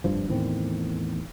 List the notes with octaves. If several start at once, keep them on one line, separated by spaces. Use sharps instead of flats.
F1 G2 F3
E2 A2 D#3 C4